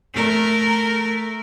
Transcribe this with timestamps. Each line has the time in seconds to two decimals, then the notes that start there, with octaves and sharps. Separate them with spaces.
0.14 A3 A#4